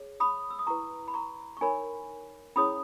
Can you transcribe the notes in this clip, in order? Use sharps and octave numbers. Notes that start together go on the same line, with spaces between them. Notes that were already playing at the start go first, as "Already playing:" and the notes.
Already playing: G#4 C#5
B5 D#6
E6
D#6
E4 B4 A#5 C#6
B5
A#5 C#6
C#6
D#4 A#4 C#5 G#5 B5
C#4 E4 G#4 C#5 B5 D#6